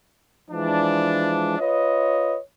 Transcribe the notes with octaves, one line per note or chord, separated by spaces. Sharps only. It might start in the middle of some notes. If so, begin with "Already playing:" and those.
E3 F3 G#3 D4
F4 B4 C#5 D#5